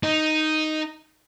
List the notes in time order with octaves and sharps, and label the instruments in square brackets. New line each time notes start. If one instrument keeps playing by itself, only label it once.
[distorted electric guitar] D#4